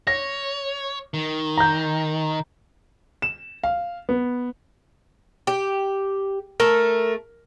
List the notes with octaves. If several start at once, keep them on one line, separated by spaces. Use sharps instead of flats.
C#5 A#6
D#3
A#5 G6
E7
F5
B3
G4
A3 A4 A#4